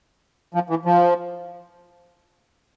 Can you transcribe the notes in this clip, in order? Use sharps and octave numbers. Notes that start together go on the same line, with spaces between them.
F3
E3
F3